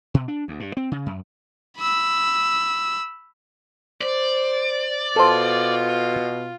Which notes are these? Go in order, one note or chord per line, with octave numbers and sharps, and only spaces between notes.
B2
D4
D2
G2
C4
C#3
F#2
B5 E6
C5 D5
B2 F4 A4 C5